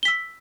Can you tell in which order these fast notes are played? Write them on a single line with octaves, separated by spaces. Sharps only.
G7 B6 E6